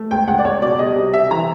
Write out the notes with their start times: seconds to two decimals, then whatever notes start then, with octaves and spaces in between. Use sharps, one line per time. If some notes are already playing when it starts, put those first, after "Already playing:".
Already playing: A3
0.11 C#2 G5
0.28 C#2 F#5
0.39 D5
0.45 C#2 C#5
0.62 B2 D5
0.79 G3 D#5
0.96 C3
1.13 C3 E5
1.31 E3 A#5